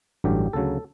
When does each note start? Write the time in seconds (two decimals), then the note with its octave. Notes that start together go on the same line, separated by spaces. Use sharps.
0.24 A1 G2 D3 F#3 G4
0.53 D2 C#3 F#3 A4